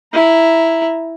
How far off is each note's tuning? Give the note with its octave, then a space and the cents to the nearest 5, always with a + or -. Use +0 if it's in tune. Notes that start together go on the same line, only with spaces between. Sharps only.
E4 +0 A#5 +0